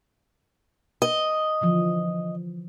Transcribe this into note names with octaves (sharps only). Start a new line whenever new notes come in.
D#5
D3 E3 F3